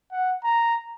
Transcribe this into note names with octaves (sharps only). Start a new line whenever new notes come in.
F#5
A#5